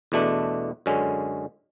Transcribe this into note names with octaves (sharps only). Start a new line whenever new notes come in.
E2 B2 A3 D4
F#2 D3 G#3 C#4